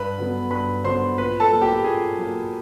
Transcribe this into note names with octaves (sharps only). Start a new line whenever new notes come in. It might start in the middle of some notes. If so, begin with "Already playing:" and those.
Already playing: G2 B4 B5
D3 F#3 B3
G2 B4 B5
D3 F#3 B3 C5 C6
A#2 B4 B5
A4 A5
F#3 A#3
G4 G5
A#2 G#4 G#5
F#3 A#3